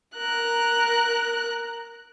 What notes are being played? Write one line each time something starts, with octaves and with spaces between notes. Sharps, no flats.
A#4 F#6